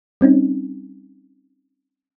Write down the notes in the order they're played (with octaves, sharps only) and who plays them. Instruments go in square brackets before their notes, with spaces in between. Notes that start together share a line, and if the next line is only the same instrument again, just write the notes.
[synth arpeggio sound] G3 C4 C#4 D#4